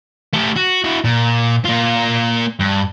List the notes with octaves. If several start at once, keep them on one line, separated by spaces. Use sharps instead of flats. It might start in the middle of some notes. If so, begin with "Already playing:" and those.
A3 G4
F#4
E4 F#4
A#2
A#3 F4
G2